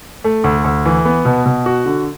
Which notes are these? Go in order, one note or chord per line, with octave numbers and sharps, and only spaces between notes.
A3
D2
D2
E3
B3
B2
B2
F#4
D3